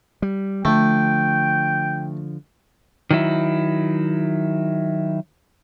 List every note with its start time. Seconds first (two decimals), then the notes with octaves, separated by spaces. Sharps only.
0.22 G3
0.65 D3 F3 A3 G5
3.11 D#3 F#3 E4